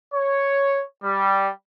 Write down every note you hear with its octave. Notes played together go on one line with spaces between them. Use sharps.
C#5
G3